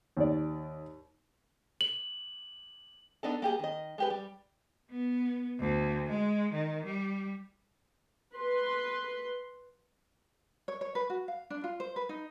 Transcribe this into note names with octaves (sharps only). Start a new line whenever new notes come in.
D#2 D5
F#7
B3 D4 D#4 A4
A#3 G4 G#4
D#3 D#5
G#3 G4 B4
G3
B3
D2
G#3
D#3
G3
B4 C6
C#5
C#5
B4
F#4
F5
D4
F4
C5
B4
D#4